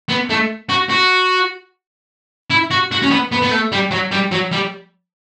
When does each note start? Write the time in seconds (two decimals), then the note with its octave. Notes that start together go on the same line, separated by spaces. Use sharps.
0.09 B3
0.30 A3
0.69 F#4
0.90 F#4
2.50 E4
2.71 F#4
2.92 F#4
3.02 C#4
3.11 B3
3.32 B3
3.42 B3
3.51 A3
3.72 G3
3.91 F#3
4.12 G3
4.32 F#3
4.52 G3